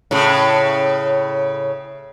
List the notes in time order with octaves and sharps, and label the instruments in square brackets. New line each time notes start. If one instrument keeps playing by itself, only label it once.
[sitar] A2 C#3